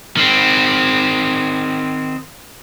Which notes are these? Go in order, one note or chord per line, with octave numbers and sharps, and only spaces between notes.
D#3 C4